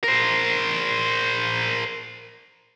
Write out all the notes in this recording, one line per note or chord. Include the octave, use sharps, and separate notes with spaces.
A#4 C5